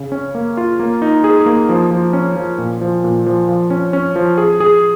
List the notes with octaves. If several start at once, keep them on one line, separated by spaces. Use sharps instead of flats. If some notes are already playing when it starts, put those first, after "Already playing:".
Already playing: C#3
C#4
A#3
F4
A#3
D#4
G#4
A#3
F3
F3
C#4
F3
A#2
F3
A#2
F3
F3
C#4
C#4
F3
G#4
G#4